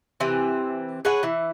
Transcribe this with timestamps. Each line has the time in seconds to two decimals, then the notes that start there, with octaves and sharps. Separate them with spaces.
0.20 C3 E3 C4
1.05 G#4 B4 C#5 F#5
1.23 E3 E4